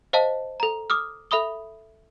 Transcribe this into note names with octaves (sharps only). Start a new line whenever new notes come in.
C5 D#5 F5 A5
A4 A#5
D6 D#6 F6
A4 E5 B5 D#6 G7